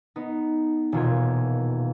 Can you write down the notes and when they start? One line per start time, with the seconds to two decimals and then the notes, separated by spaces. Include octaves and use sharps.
0.16 B3 D#4
0.92 D#1 E2 B2 F4 G#6